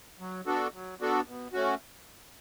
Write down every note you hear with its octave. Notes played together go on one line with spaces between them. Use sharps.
F#3
B3 D4 F#4 A4
F#3
B3 D4 F#4 A4
B2
A3 C#4 F#4